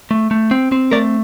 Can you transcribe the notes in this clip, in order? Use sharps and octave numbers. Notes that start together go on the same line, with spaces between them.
A3
A3
C4
C4
A3 A#4 D5